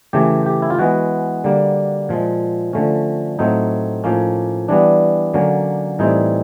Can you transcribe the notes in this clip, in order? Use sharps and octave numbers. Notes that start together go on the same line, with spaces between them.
C#3 E3 A3 G4
G4
E4
F4
E3 G#3 B3 F#4
D3 G3 A#3
A#2 F3 G#3
D3 F3 A3 C#4
A2 F#3 A3 C4 D#4
A2 F3 A#3 C#4
E3 G3 B3 D4
D3 F#3 A#3 C#4
A2 E3 G3 C4 D#4